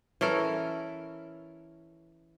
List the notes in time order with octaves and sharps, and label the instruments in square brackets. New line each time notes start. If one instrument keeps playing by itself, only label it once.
[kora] E3 C#4 A4 A#4